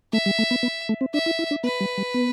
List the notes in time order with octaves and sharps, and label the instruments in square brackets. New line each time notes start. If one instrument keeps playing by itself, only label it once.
[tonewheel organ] A3 [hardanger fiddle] E5
[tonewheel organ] G3
A3
B3
B3
A3
C4
[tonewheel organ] D4 [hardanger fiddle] E5
[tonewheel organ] E4
E4
D4
[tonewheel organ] B3 [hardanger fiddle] B4
[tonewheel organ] G3
G3
B3